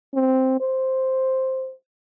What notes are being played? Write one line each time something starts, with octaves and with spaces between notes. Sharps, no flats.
C4
C5